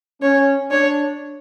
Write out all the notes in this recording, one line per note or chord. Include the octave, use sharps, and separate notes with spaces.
C#4 C#5
D4 C#5